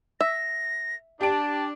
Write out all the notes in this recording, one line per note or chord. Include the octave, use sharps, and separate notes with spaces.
E5 A#6
D4 G4 A5 D7